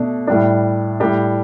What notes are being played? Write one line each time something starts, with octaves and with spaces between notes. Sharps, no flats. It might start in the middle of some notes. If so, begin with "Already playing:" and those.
Already playing: B2 A3 D4
A2 G3 D4
A2 G3 D4 G4